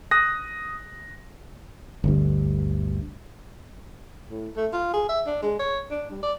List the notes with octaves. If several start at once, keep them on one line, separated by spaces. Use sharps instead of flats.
D#6 F#6 A#6
G1 D2 G2
A2
A3
F4
G#4
E5
D4
G#3
C#5
D4
G3
D5